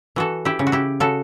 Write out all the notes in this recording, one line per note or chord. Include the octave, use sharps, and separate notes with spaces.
E3 F#4 A4
E4 G4
C#3
F#4
E4 G4
C#3 F#4 A4